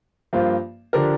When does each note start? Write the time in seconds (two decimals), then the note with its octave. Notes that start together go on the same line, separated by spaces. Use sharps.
0.33 G2 F3 A#3 F4 C5
0.93 D3 F3 D4 G4 A#4